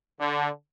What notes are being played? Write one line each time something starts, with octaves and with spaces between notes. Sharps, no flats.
D3